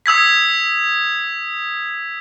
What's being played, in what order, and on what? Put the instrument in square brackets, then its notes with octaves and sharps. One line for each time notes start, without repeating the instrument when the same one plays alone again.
[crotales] D#6 E6 G#6 B6